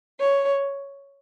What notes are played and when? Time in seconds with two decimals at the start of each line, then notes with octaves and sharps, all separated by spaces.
0.20 C#5